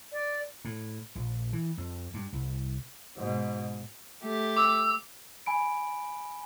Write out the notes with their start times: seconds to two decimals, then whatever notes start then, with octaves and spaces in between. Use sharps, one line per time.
0.12 D5
0.65 A2
1.15 A#1
1.53 E3
1.77 F2
2.14 G2
2.32 C2
3.17 G#2 B2
4.23 A3 G4
4.57 D6 E6
5.46 G#5 B5 D7